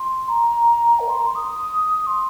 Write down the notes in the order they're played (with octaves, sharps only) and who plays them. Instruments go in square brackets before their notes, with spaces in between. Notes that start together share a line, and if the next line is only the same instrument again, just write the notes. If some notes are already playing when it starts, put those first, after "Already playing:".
Already playing: [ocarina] C6
A#5
A#4
C6
A#5
C6
D#6
C6